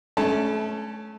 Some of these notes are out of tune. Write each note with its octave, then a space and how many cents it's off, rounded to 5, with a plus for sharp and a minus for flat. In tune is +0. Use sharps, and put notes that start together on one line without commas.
A3 -30 C#4 +0 A5 +10